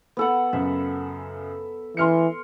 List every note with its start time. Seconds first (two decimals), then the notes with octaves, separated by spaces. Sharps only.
0.17 B3 A4 F#5
0.53 F#2 C#3 E5
1.97 E3 C6 F6 C#7